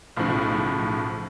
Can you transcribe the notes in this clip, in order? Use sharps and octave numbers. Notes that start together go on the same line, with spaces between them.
B1 A2 C#3 F3